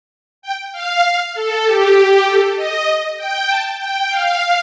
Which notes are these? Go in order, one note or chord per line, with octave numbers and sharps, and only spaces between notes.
G5
F5
F5
A4
G4
A4
D#5
G5
A5
G5
F5